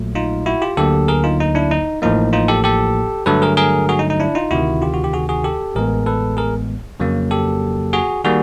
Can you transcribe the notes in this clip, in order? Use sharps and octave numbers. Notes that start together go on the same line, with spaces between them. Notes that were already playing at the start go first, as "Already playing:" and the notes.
Already playing: A#1 A#2 F#3 A3
D#4 F4
E4 F#4
F4 G4
D2 D3 F#3 A#3 G4 A4
G#4 A#4
D#4 F4
D#4
D4 E4
D#4
A1 A2 F3 A#3 D#4
D#4 F4
G4 A4
G4 A4
G2 D3 F#3 A3 A4 B4
G#4 A#4
G#4 A#4
F#4 G#4
D#4
D#4
D4 E4
D#4 F4
D2 C3 D#3 E4 F#4
F4 G4
F#4
G4
F#4 G#4
F#4 G#4
G4 A4
A1 A2 E3 G#3 B3 G#4 A#4
A4 B4
G#4 A#4
F2 C#3 F#3 A#3
G4 A4
F#4 G#4
D#3 G3 A#3 F#4 G#4